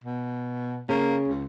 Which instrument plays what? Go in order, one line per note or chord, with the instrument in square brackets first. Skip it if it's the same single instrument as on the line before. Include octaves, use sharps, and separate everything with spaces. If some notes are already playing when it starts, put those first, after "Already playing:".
[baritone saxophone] B2
[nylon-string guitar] C#3 [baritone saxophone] A#3
[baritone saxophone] C#2